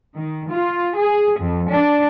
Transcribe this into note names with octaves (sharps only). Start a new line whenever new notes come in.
D#3
F4
G#4
F2
D4